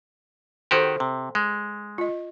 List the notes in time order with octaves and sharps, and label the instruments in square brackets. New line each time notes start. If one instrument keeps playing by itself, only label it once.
[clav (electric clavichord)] D#3 F#4 G4 [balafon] A4 C5 C6
[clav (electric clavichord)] C3
G#3
[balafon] F4 D#5